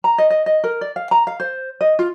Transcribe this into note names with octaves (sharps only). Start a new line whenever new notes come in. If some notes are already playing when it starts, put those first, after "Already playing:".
A#5
D#5
D#5
D#5
A#4
D5
F5
A#5
F5
C5
D#5
F4